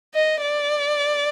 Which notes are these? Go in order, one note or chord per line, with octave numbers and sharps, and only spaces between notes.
D#5
D5